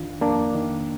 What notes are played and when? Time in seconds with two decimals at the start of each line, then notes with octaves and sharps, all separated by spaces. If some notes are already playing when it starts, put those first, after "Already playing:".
Already playing: F2 D#3 D4 F4
0.21 F2 A#3 D4
0.55 D#3